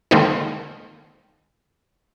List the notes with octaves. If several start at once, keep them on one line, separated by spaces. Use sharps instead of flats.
D3 D#3 G#3 A#3 C4 D#4